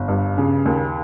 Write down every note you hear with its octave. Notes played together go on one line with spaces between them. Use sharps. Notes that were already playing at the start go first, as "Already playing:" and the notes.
Already playing: G1
G2
C#3
D#2